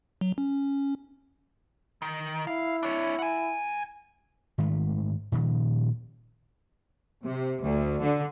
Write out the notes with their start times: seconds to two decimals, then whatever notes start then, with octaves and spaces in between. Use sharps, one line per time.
0.21 F#3
0.38 C#4
2.02 D#3
2.47 E4 F5
2.83 D4 C#5
3.19 F#5 G#5
4.58 G#2 D#3 G#3 A3
5.32 A#2 D#3 F3
7.22 C3
7.60 D2
8.00 D3